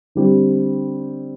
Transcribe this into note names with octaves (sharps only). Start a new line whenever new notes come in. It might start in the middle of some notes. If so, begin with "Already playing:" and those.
D3 G3 C4